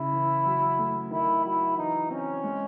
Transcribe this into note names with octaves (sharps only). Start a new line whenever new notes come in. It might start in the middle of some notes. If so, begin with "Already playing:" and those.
Already playing: C#3 E4
E3
F#3
A3
D#3 E4
F#3 E4
E3 D#4
C4 C#4
G#3